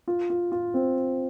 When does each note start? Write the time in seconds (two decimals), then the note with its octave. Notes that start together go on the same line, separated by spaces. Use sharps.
0.08 F4
0.30 F4
0.52 F4
0.74 C4